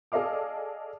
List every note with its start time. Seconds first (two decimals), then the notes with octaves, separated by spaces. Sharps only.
0.12 G#4 A4 D5 D#5 F5 D6